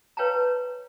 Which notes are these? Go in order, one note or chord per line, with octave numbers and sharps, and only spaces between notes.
B4 C#5 F5 G5 A5 A#5